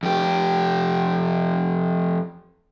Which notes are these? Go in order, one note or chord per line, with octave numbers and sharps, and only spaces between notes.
F2 G4